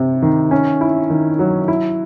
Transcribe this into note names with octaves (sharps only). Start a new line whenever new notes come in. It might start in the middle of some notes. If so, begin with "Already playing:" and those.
Already playing: C3 C4
D#3
C#4
E4
D#3
F#3
E4